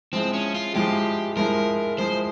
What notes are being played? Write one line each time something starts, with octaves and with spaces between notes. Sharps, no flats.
F3 G#3 C4 E4
C#4
F4
F3 G#3 E4 G4
F3 G#3 E4 A#4
F3 G#3 E4 C5